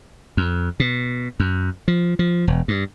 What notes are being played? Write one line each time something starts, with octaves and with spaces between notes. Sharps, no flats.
F2
B2
F#2
F3
F3
E1
G2